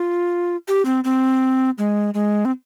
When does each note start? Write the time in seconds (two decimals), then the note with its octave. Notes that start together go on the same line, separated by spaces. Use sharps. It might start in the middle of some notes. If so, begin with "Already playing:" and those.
Already playing: F4
0.68 G4
0.85 C4
1.04 C4
1.78 G#3
2.14 G#3
2.45 C4